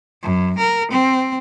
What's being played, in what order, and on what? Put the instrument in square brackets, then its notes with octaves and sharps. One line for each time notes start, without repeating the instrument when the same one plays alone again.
[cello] F#2
A#4
C4